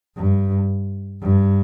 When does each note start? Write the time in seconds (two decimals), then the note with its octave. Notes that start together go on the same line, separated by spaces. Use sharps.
0.16 G2
1.22 G2